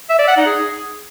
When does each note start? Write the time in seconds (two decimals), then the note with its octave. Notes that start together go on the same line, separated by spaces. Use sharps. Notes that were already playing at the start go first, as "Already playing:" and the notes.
0.09 E5
0.18 D5
0.28 F#5
0.37 D#4
0.46 G#4